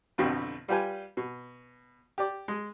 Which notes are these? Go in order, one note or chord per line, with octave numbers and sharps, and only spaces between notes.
A1 F2 B2 D3 G5 B5
G3 F4 G4 B4 G#5
B2
G4 D5
G#3